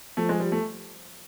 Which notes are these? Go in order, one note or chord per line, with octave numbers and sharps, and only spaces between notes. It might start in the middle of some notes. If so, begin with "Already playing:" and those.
F3 A3
G#3
G3
A3